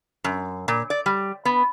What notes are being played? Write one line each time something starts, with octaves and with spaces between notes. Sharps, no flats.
F#2
A#2
D5
G3
B3